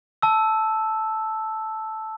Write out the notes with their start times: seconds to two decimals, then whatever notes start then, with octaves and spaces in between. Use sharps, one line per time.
0.22 A5 E6